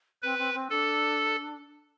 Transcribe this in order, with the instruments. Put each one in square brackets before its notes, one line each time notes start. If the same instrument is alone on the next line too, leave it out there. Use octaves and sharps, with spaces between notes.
[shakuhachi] C4 [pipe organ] B4
[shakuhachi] C4
C4
[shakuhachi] D4 [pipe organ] A4